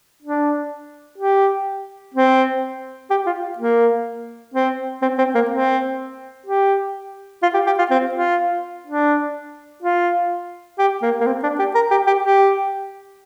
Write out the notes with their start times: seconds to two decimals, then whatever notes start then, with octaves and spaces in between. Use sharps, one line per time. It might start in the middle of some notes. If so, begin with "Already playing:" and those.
0.22 D4
1.18 G4
2.14 C4
3.10 G4
3.26 F4
3.58 A#3
4.54 C4
5.02 C4
5.18 C4
5.35 A#3
5.50 C4
6.46 G4
7.43 F4
7.54 G4
7.66 G4
7.79 F4
7.91 C4
8.14 F4
8.87 D4
9.83 F4
10.79 G4
11.02 A#3
11.21 A#3
11.27 C4
11.43 D4
11.59 G4
11.75 A#4
11.91 G4
12.07 G4
12.23 G4